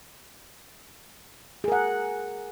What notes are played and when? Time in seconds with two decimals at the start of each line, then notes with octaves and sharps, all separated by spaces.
1.64 G#4
1.68 A#4
1.72 F#5